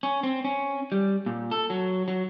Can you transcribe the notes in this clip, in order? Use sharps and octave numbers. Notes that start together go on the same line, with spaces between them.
C#4
C4
C#4
G3
A#2
A4
F#3
F#3